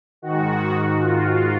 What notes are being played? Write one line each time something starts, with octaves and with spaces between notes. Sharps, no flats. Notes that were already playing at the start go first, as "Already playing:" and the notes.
G#2 D#3 F#4
F4